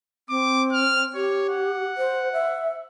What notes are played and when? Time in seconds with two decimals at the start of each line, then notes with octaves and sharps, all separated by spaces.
0.29 C4 D6
0.72 F6
1.15 G4 C#5
1.49 F#5
1.97 C5
2.33 E5